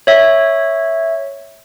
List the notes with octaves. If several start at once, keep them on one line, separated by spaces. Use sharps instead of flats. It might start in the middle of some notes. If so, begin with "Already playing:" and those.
C#5 E5